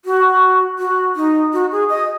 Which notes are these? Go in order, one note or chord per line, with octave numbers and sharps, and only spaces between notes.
F#4
F#4
D#4
F#4
G#4
D#5